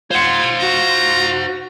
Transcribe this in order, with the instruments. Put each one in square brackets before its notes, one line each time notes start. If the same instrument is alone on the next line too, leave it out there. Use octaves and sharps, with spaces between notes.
[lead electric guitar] F4 [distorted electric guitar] C5 F#5 [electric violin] C6 G#6
[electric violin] F#4 [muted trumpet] A#5